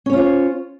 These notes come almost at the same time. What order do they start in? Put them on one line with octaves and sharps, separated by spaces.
C#4 C#5 F4 C5